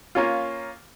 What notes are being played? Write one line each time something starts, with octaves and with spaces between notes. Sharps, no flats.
A#3 C#4 F4